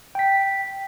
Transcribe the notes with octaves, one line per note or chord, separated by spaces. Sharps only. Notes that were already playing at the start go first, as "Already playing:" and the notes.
G5 B6